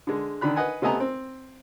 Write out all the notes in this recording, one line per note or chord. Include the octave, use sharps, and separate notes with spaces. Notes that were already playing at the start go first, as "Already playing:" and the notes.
D3 G#3
D3 D#3 D4 B5 F#6
B4 D#5 F#5 G#5
C3 A3 B3 D#5 G#5 A#5
C4